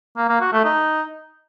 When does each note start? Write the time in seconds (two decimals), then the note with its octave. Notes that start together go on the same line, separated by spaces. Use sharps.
0.17 A#3
0.29 A#3
0.41 F#4
0.53 A3
0.64 D#4